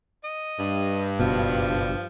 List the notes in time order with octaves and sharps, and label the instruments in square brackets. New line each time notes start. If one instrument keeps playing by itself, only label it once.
[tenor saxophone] D#5
[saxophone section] G2
[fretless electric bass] F#1 B2 [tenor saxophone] F3